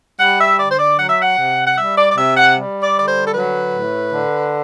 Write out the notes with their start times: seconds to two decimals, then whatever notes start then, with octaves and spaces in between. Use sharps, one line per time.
0.20 G3 F#5
0.40 E5
0.59 D3 D5
0.71 C5
0.79 D5
0.98 F#3 F#5
1.10 E5
1.21 F#5
1.38 C3
1.67 F#5
1.77 G3 E5
1.97 D5
2.11 D5
2.17 C3 E5
2.37 F#5
2.57 G3
2.83 D5
2.95 D3 D5
3.08 C5
3.27 A4
3.34 F#3 B4
3.75 A2
4.13 D3